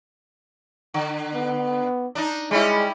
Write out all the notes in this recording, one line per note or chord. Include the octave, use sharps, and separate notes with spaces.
D3
B3
D4 D#4
G3 G#3 C#4 E4